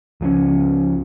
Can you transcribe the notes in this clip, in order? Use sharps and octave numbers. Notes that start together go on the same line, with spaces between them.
C#2 F3 F#3 C#4